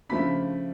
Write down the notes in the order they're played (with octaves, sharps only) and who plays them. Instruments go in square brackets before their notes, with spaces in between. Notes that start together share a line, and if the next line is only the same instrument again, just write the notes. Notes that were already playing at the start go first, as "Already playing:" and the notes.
[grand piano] C#3 F3 A3 D4 B5 B6